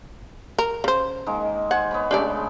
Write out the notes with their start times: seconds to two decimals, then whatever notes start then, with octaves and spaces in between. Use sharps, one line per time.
0.58 A#4
0.84 C#3 C5
1.26 D#3 G#3 A#3
1.71 C5 F#5 G#5
1.91 B3 C#5 B5
2.11 C#3 G#3 A3 D4 G4 D5